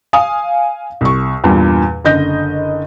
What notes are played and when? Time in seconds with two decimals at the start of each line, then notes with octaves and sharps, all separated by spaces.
0.13 F5 G#5 D#6
1.01 C2 C#6
1.44 E2 G2 A#2 G3
2.04 F#1 D3 D#5 G6 A#6